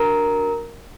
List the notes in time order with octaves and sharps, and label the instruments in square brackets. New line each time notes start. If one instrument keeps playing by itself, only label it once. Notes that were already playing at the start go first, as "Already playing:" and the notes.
Already playing: [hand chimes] D4 F#4 A#4 A#5